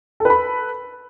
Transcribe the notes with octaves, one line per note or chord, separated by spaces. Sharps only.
A4 B4 B5